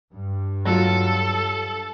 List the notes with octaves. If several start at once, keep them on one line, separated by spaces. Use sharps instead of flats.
G2
F#3 F4 A4